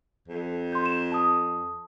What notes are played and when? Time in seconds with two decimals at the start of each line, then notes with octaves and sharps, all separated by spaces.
0.28 F2
0.73 C6 G6
0.86 E7
1.12 A5 D#6